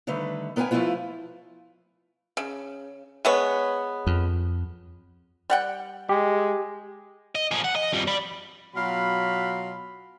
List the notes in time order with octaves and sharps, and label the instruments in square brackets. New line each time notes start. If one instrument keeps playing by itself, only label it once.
[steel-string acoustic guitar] D3 D#3 G3 A3 B4
B3 A#4 B4 E5 G5 G#5
F3 A3 A#3 E4 F4 B4
[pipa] C#3
G#3 B3 C#5
[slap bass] F2
[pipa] G3 F#5 G5
[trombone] G#3 [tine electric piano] G4
[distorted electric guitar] D#5
F3 G#4
F#5
D#5
F2 G3
D5 B5
[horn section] B2 F#3 F4 F5 B5